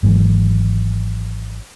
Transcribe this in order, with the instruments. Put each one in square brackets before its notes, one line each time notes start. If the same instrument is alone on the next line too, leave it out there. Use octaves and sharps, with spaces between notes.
[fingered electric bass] G#1 G#2 E3 F#3